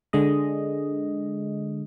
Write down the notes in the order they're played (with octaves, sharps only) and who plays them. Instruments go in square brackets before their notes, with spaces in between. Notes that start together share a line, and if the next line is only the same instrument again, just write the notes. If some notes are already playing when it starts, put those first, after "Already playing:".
[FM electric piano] D3 G#3 D#5